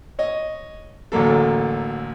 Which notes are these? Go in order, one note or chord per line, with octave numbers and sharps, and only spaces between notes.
C#5 D#5
A1 D2 F#3 A#3 A4